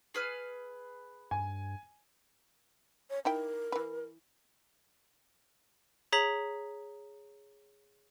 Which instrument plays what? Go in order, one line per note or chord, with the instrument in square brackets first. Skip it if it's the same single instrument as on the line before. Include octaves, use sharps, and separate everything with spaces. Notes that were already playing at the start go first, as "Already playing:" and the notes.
[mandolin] G#4 B4 F6
[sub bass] G2 [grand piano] G#5
[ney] C#5
[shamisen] D#4 E4 G5 [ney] A#4
[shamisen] E3 B4
[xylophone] G#4 C#5 A#5 B6 F#7